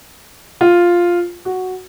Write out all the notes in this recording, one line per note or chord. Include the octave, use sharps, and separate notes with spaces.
F4
F#4